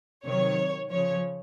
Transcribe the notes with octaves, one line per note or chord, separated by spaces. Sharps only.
C3 D#3 F#3 C#5
C#3 F3 C#5